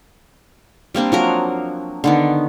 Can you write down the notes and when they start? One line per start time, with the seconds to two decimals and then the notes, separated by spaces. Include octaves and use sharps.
0.95 G3 A#3 C4 D4
1.12 F3 F#3 A#4
2.04 D3 D#3 B3